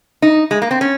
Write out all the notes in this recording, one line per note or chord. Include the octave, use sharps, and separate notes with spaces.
D#4
G#3
A#3
C4
C#4